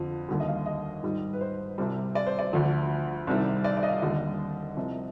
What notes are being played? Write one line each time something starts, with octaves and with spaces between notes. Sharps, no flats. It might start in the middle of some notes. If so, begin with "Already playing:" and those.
Already playing: F2 D3 F3
D#2 D3 G3
D#5
F5
D#5
G#2 D#3 G3
B4
C5
C2 C3 G3
D5
C5
D5
D2 D3 F3
C2 C3 D#3 G3
D5
D5
D#5
F5
D#2 D3 G3 D#5
C2 C3 F3